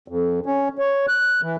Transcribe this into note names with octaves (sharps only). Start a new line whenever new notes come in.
F2
C#4
C#5
F#6
E3